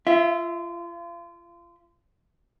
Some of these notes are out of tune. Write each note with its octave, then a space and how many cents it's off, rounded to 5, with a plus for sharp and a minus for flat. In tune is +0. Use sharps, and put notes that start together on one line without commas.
F4 -30 E5 +0